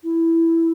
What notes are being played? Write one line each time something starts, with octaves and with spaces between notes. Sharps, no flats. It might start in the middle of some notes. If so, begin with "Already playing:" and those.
E4